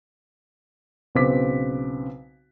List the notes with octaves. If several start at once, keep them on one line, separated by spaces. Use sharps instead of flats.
B1 C#3 C4 B4 D6 B6